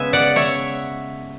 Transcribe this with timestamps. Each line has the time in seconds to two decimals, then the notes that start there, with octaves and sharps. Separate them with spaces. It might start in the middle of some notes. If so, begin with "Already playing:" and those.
Already playing: C#3 G#3 B3 E5 G#5
0.13 D5 F#5
0.36 C#5 E5